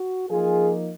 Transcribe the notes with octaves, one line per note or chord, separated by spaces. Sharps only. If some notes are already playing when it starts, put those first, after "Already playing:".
Already playing: F#4
F3 A#3 D#4 F4 G#4